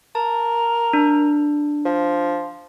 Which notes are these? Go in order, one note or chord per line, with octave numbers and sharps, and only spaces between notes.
A#4 A5
D4
F3